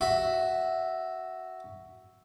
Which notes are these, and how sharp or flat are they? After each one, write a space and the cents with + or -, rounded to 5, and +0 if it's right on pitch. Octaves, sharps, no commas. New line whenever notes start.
F#4 +5 E5 -5